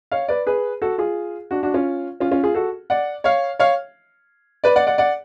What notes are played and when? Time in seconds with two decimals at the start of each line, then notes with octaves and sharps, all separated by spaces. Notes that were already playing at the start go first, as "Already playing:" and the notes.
0.12 C#5 F5
0.28 B4 D5
0.47 G#4 B4
0.82 F#4 A4
0.98 F4 G#4
1.51 D4 F#4
1.63 D4 F#4
1.74 C#4 F4
2.20 C#4 F4
2.31 C#4 F4
2.44 F4 G#4
2.55 F#4 A4
2.90 D5 F#5
3.24 C#5 F5
3.59 C#5 F5
4.64 B4 D5
4.76 D5 F#5
4.87 D5 F#5
4.98 D5 F#5